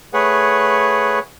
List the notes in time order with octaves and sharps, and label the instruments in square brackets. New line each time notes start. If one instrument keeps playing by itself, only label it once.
[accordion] A3 G#4 B4 C#5 F#5